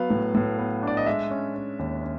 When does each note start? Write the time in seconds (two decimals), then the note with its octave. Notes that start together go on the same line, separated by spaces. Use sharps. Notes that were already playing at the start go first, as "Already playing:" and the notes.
Already playing: F#3 B3 F5
0.10 A2
0.35 A2
0.58 B3
0.83 D4 D5
0.97 D#5
1.06 G#3 E5
1.31 C#4
1.55 C#4
1.79 D#2
2.03 C#4